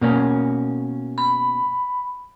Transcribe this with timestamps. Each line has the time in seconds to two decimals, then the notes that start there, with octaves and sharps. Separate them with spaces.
0.01 B2 A#3 C#4
1.18 B5